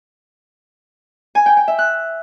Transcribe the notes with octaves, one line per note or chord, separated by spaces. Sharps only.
G#5
G5
G5
E5
F#6